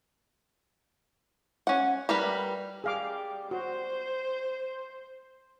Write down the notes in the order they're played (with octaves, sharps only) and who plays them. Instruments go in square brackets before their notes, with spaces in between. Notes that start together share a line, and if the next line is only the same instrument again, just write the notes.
[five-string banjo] C#4 F#5
G3 A#4 B4
[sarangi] G3 [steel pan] G#4 F5 D6
[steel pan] F#4 [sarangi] C5